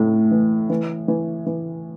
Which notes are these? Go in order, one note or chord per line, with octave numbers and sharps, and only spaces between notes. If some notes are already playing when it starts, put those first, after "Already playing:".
Already playing: A2
E3
E3
E3
E3